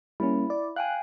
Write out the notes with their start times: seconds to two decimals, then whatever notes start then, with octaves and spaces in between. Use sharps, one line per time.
0.20 G3 A#3 C#4 E4
0.50 D5
0.76 F5 G5 G#5 F#6